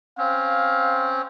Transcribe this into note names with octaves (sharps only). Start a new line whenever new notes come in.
C4 C#4 F5